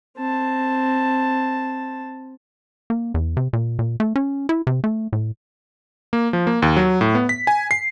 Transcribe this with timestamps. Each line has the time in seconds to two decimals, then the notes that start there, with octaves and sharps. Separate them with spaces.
0.17 C4 A5
2.90 A#3
3.14 E2
3.37 C3
3.53 A#2
3.79 A#2
4.00 A3
4.16 C#4
4.49 E4
4.67 C3
4.84 A3
5.13 A2
6.13 A#3
6.33 F3
6.47 A#3
6.62 D#2
6.76 F#3
7.01 A2
7.15 B3
7.29 B6
7.47 G#5
7.71 C7